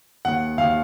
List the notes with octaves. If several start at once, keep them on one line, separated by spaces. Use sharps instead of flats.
D#2 F#5
D#2 F5